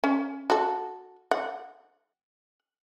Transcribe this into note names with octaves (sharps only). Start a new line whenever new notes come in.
C#4
F#4 A4
F#5